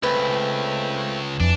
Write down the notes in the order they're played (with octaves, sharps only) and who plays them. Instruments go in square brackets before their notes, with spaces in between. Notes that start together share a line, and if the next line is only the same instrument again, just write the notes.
[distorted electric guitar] C#2 [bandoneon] A3 C4 [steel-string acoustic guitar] B4
[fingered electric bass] F2 [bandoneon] E3 [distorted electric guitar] D4